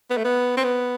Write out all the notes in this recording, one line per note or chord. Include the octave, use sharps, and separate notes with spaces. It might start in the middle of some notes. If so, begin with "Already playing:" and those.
B3
A3
B3
C4
B3